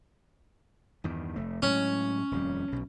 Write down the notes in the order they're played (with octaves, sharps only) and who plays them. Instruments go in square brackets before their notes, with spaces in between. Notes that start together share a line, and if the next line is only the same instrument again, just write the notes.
[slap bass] E2 G2 D#3
F1 A3
[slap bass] A2 F#3 G#3 [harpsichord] C#4
[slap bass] D#1 F2 G3
B1 B2